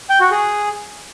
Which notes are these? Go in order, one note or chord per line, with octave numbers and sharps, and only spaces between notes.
G5
F#4
G#4